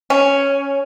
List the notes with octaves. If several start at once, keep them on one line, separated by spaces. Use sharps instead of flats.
C#4